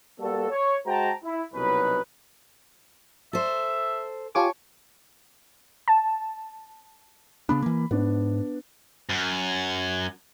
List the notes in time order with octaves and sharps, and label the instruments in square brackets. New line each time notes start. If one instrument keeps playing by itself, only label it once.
[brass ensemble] G3 A#3 B3 F#4 A4
C#5
G#3 F#4 C5 G5 A5 A#5
E4
C2 B2 F#3 C#4 D#4 B4
[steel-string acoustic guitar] A4 C5 [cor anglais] E5
[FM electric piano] F4 G4 D6 [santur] C#5 A5 [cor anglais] G#5
[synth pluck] A5
[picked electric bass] C#3 B3 D4 [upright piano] B5
[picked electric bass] E3 A#3
[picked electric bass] G#2 [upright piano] B3 D4
[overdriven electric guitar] F#2